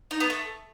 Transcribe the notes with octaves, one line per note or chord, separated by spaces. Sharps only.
D#4
B3
A3